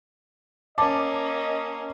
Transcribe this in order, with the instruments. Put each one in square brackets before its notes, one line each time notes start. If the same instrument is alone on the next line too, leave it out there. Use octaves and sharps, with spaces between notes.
[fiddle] A#3 C#4 [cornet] D#5 [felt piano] A5 [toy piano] D6